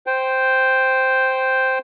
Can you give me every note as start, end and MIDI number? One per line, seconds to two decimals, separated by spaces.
0.07 1.79 72
0.07 1.79 79